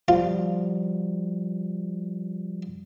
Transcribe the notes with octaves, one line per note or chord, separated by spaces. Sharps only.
F3 G3 F4